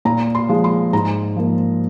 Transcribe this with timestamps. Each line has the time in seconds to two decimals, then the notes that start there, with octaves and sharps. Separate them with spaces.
0.05 A#2 A#5
0.35 C6
0.49 F3 G#3
0.64 C6
0.93 G#2 A#5
1.36 F3 A#3